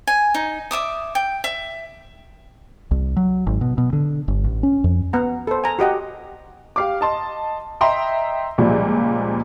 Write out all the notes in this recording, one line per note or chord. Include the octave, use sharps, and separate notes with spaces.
G#5
D#4
D5 E5 D6 D#6
G5
E5
C2
F#3
G#1
B2
B2
D3
G1
A1
C#4
F2
B3 F#5 A#5
A4 C5
G#5 A#5
F#4 G4 D#5 F#5
G4 F5 D6
D#5 A5 C6
D#5 E5 G5 A#5 C6
C#2 A#2 F3 G3